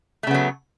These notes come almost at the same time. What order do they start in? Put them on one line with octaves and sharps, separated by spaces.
A3 C#3 B3 F#3